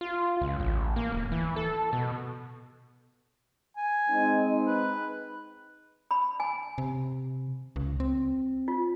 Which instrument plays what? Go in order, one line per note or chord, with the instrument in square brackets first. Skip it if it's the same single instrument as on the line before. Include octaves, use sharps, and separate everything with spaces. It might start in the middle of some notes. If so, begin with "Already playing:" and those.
[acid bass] F4
C#2
A1
A#3
D1
E3
A4
B2
[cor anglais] G#5
[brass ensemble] G#3 C4 D#4
[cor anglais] B4
[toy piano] B5
G#5
[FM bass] C3
C#2
C4
[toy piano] F4